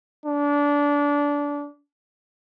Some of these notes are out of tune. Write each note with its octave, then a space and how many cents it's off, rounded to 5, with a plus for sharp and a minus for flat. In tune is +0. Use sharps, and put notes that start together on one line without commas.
D4 -20